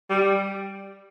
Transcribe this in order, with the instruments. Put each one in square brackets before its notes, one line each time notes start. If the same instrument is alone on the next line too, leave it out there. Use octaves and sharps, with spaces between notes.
[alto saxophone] G3